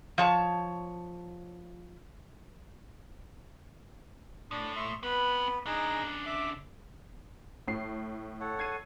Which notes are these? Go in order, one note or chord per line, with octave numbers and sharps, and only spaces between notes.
F3 C#5 A5
A2 D4
E5 C6 C#6
B3 C4 B4 B5
C#3 D4 D#4 G#4 A#5
E5 D6
A2 C7
A4 C#5 F#5
G#6 C7 D#7